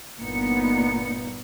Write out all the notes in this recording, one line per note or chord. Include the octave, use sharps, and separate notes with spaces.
G1 A#2 B3 D#4 C#7